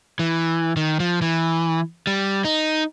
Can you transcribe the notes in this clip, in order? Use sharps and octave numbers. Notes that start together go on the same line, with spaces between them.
E3
D#3
F3
E3
G3
D#4